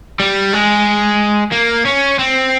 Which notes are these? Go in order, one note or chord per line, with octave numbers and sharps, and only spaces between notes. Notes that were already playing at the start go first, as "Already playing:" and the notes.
G3
G#3
A#3
C#4
C4